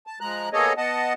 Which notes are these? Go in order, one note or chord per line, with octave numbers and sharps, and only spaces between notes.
A5
F3 G#3 A#5 F#6
A#3 B3 G#4 A4 C#5 D#5
B3 D#5 F#5 A5